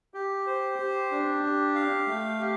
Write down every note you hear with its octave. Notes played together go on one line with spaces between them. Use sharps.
G4
C5
G4
D4
G4
F5
A3
G4